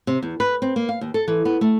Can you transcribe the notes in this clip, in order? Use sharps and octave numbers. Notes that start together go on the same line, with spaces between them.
C3
E2
B4
C4
A#3
F5
D#2
A4
E3
B3
A3